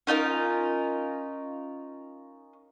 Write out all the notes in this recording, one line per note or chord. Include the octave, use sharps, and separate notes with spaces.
C#4 D#4 F4 A#4